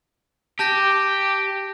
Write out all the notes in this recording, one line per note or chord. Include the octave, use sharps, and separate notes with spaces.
G4 A5 G6 A#6